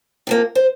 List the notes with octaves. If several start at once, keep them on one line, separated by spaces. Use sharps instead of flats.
C3 F3 A#3
C5